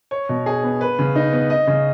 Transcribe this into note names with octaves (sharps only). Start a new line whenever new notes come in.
C#5
B2
G#4
B3
B4
C#3
D#4
B3
D#5
C#3